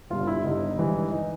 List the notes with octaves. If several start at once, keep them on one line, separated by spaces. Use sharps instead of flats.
G1 G2 D3 F4
E4
G1 G2 D3 D#4
G#1 G2 E3
E3 D#4